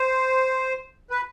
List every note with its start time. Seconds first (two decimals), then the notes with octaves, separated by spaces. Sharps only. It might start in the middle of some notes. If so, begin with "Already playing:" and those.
Already playing: C5
1.10 B4